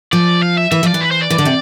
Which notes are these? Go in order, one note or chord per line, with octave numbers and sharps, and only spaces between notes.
F3 D5
F5
E5
E3 E5
F3 D5
E3
B4
C5
D5
E3
D3
C3